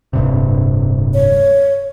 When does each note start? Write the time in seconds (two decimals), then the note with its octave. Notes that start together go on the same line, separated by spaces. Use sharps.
0.13 D1 G2 C3
1.14 C#5